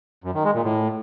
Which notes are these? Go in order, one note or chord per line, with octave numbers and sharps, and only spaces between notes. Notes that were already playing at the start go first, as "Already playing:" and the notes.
F#2
D#3
G#3
A#2
A2